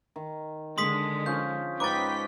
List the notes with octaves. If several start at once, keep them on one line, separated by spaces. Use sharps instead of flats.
D#3
D3 G#3 C6 D#6 B6
F3 C#4 F4 G6
G#2 C#4 D#4 B4 G5 D6 A6 B6